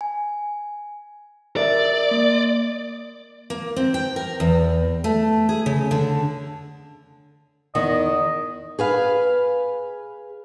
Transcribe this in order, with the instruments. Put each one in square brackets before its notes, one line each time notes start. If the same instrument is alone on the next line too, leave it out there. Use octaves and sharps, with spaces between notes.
[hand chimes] G#5
[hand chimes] A#4 E5 [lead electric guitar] D5
[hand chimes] A#3
[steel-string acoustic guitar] A#3
C4
G5
A#4
E2
A3
G#4
C#3
D3
[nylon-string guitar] E2 D#3 F#5 [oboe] D#5
[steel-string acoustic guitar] G#4 B4 F5